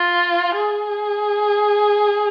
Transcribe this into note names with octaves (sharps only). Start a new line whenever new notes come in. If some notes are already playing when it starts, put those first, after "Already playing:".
Already playing: F4
G#4